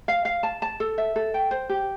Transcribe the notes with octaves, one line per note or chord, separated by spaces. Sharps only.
F5
F5
A5
A5
A4
E5
A4
G5
C5
G4